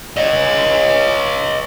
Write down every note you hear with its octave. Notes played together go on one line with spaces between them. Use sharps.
C#5 D#5